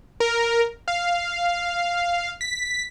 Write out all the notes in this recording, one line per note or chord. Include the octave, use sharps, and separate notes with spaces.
A#4
F5
B6